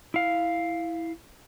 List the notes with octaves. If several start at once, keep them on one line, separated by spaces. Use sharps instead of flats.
E4 F5